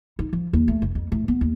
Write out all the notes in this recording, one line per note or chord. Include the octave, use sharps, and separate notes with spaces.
D#4
F3
D#2
A3
F1
F2
A2
B3
D#2